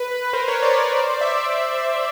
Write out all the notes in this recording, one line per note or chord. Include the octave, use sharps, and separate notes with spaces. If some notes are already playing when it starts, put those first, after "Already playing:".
Already playing: B4
B4
A#4 C5
B4 C#5
C5 D5
D5 E5